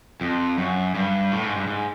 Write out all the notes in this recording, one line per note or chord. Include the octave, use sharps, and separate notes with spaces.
F2
F#2
G2
A2
G#2
G2
G#2